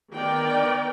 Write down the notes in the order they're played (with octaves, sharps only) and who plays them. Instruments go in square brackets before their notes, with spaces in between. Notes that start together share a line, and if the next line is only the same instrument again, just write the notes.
[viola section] D#3 B3 A#4 D5 G5